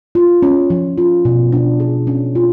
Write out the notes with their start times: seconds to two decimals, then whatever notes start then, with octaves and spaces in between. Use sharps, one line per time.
0.15 F4
0.42 C#4
0.70 F3
0.98 F4
1.25 B2
1.52 D4
1.80 G#4
2.07 C#4
2.35 F4